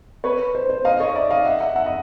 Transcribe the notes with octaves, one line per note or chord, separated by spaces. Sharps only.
B4 C#5
C5
C5
D#5 F5
C#5 D#5
D5 E5
D#5 F5
E5 F#5
E5 F#5
E5 F#5
D#5